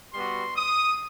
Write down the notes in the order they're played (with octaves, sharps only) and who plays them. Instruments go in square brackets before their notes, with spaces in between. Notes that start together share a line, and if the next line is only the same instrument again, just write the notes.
[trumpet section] G3 B3 F#4 C6
D#6